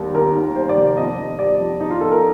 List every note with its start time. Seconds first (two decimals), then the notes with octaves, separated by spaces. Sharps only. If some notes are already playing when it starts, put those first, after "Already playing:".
Already playing: D#2 D#3 G3
0.14 D#2 A#4
0.35 D#2
0.55 G3 C5
0.69 D5
0.77 F1
0.97 F2 D#5
1.18 F2
1.39 G3 D5
1.60 F2
1.80 F2 D#4
1.91 F4
2.01 F2 A4
2.12 A#4